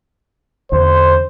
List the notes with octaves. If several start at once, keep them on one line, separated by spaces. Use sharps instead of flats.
E2 D3 C5